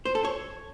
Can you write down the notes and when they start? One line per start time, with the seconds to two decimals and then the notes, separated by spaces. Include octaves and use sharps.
0.05 C5
0.15 A4
0.25 C#5